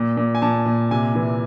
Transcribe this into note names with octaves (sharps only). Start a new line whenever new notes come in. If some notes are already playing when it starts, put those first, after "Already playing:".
Already playing: A#2
A#2
G#5
A#2 A5
A#2
C3 G#5
E3